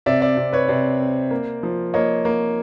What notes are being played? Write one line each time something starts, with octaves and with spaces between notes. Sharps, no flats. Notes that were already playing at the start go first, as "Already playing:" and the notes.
C3 D5 E5
D5 E5
C3
B4 C#5
C3 C5 D5
C4
A#3
F3
A#3 C#5 D#5
A#3